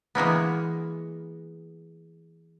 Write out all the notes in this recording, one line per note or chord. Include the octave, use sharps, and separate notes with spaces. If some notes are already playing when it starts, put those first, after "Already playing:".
E3 G#3 A#3 B3